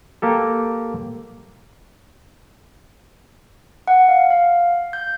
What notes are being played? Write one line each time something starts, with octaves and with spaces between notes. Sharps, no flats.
A#3 G4 A4
F#5
F5
F5
G6